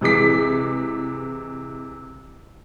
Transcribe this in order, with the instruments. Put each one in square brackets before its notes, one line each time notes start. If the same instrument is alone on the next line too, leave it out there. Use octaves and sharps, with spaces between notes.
[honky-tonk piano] C3 E3 G#3 D6 B6